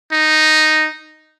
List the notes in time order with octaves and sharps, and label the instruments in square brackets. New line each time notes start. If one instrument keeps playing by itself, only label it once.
[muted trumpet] D#4